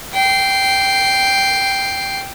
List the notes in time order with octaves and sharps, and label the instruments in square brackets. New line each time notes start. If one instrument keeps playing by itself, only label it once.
[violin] G5 C7